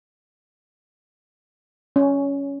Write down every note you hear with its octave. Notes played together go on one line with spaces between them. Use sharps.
C#4